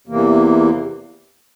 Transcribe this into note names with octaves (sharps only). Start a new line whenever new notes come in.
E2 C3 E3 A#3